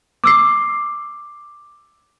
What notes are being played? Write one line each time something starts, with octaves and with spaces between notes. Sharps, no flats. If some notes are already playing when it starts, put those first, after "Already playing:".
D6 E6 C7